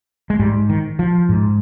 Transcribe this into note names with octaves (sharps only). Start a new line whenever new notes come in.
G#3
G#2 G3
D#3
F3
G#2